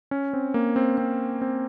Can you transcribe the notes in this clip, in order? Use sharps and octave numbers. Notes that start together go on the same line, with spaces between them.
C#4
C4
A#3
C4
C4
C4